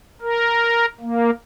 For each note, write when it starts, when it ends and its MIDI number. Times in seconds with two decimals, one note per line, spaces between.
0.22 0.86 70
1.00 1.30 58